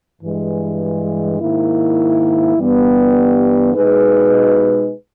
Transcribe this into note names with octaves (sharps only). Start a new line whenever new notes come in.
G2 E3 G#3
G#2 D#3 A#3 E4
G2 E3 G3 B3 G4
B2 G#3 D#4 G#4 B4